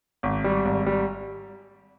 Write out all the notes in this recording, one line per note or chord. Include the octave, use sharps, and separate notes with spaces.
G#1
G3
G#1
G3